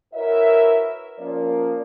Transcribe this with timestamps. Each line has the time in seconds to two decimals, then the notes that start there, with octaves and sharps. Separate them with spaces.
0.14 E4 F#4 A#4 B4 C#5 E5
1.19 F3 A#3 C#4 D5